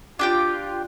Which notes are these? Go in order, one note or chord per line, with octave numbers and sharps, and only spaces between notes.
D4 F4 G4 G5